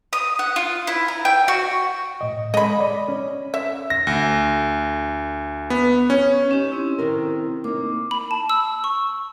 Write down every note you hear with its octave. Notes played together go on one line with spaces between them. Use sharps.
D#6
F#5
F4
E4
A#5
G5
F#4
A2 D#5
G#3 D#5 B5
D5
C#4
E5
A#6
D2
B3
C#4
C#4 D#4 G4
C4 E4
C3 D#3 A#4
A#3 D#4 D6
B5
A5
E6
C#6